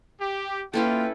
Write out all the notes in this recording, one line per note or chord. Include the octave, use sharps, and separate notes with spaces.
G4
A#3 C#4 E4 F4 A4 B4 G5